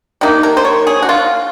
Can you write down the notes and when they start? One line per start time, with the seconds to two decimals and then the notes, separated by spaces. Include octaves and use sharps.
0.21 C3 D#3 A#3 D#4
0.43 A#4
0.57 C5
0.65 C#5
0.87 G#4
1.02 F#4
1.09 F4